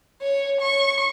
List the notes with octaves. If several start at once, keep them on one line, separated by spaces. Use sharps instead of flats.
C#5
C#6